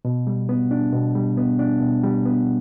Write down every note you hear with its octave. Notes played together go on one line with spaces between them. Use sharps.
B2
G3
B3
D4
B2
G3
B3
D4
B2
G3
B3